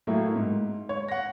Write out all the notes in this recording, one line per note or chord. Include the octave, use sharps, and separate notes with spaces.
A2 F#3 A3 A#3 E4
G#2
C#5
F#5 A#6